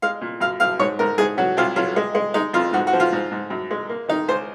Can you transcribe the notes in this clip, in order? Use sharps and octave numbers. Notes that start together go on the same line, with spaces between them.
G#3 F5
A#2
F#2 F5
F#2 F5
G#2 C#5
G#2 A#4
G#2 G#4
F#3 F#4
C2 F4
F#3 F4
G#3
G#3
G#3 D#4
F2 F4
G#2 F#4
F#4
F3
F4
G#2
G#2
F#2
G#3
A#3
D#3 D#4
C#2 C5